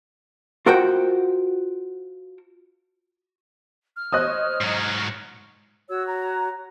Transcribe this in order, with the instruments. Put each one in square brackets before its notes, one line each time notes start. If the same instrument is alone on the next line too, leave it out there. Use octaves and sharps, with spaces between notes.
[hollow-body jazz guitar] F4 F#4 A#4 C5 F#5 G5
[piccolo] F6
[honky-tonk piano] C5 C#5 D#5 [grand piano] D#6 F#6
[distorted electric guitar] G#2 F#3
[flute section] F#4 C#5 [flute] E6
[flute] A#5